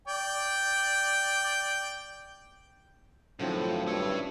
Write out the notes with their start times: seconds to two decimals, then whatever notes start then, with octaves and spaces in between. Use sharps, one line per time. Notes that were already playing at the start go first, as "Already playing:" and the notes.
0.08 D5 G5
3.39 F#2 A2 D3 D#3 F3 C4
3.87 G2 E4 C#5